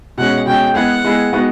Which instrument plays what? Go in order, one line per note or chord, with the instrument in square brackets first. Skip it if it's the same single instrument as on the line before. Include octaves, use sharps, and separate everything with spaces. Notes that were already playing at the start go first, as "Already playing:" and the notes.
[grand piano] B2 G#3 C#4 [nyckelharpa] F#5
[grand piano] B2 G#3 C#4 [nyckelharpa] G5
[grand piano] G#3 B3 E4 G#4 [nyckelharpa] F#5
[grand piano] G#3 B3 E4 G#4
G#3 B3 D#4 F#4